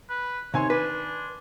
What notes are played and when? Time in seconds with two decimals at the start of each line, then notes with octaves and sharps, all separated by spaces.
0.10 B4
0.54 C3 D#3 C#5 G#5 C6
0.70 D4 B4